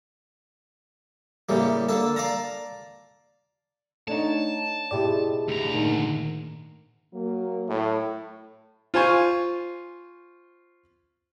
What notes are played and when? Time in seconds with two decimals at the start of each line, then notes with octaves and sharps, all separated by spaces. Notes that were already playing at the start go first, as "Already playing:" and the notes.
1.49 A2 C#3 G3 A#3
1.89 D3 A#3 A4 A5
2.16 D5 F5 A5 A#5
4.08 A3 D4 D#4 C#5 F#5 A5 A#5
4.91 G#2 B2 B3 E4 G4 D5
5.48 D2 A#5
5.74 A#2 D#3 A#3 A#4
7.14 F#3 A#3
7.69 A2
8.94 F4 C5 G#5 C#6